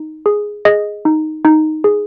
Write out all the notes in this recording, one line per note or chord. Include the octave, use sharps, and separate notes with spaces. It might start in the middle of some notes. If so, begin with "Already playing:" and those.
Already playing: D#4
G#4
G#4 D#5
D#4
D#4
G#4